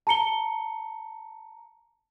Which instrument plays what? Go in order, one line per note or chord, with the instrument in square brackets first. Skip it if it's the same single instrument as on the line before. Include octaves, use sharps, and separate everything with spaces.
[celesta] A5 A#5 C#7 G7